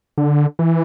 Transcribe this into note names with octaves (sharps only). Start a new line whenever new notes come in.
D3
E3